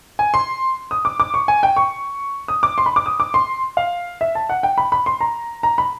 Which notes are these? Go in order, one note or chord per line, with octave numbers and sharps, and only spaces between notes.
G#5
C6
D#6
D6
D6
C#6
G#5
G5
C#6
D#6
D6
C6
B5
D6
D#6
D6
C6
F5
E5
A5
F#5
G5
B5
B5
C6
A#5
A#5
B5